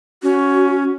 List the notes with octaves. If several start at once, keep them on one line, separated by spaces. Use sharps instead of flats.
C#4 F#4